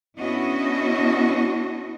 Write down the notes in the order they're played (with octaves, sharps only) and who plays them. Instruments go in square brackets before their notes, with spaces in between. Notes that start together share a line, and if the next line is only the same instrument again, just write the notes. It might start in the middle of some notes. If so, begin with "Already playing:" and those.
[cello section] B3 C#4 D4 E4 F#4 D#5